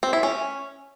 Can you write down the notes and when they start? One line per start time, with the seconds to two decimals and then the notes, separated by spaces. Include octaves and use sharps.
0.03 C4
0.13 E4
0.23 C#4